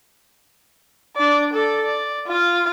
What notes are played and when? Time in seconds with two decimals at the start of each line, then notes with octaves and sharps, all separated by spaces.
1.16 D4 D5
1.53 A4 D5
1.85 D5
2.28 F4 F5